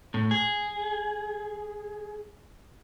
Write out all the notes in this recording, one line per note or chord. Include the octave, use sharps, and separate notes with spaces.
A2
G#4